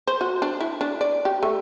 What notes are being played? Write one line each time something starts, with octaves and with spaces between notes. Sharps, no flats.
C5
F#4
D4
E4
D4
D5
G4
A3